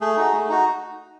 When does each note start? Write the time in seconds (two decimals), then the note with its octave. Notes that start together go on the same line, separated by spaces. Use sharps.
0.01 A3 G#4
0.17 D#4 F#4
0.33 A3
0.49 D#4 F#4